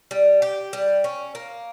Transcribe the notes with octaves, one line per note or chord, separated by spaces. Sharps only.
G3
G4
G3
C#4
A#3